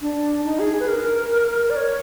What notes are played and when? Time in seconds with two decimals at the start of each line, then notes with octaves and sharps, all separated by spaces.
0.01 D4
0.45 D#4
0.59 G#4
0.80 B4
0.88 A#4
1.70 D5
1.76 C#5